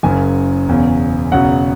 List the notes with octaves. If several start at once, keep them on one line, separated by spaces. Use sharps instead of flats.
F#1 F#2 C#3 G#5
E1 E2 C#3
E1 E2 C#3 F#3 F#5